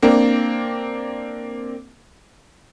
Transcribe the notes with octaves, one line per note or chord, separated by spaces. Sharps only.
A#3 C4 D4